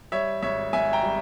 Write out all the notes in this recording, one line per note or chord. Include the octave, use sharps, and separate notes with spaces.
G3 C#5 E5
G#1 C#5 E5
G#1 E5 G#5
G5 A#5
G3